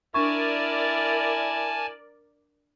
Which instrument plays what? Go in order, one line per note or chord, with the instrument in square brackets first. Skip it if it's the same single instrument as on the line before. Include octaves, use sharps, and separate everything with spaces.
[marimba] D4 C#6 [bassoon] E4 [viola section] A#4 D5 [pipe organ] G#5 A5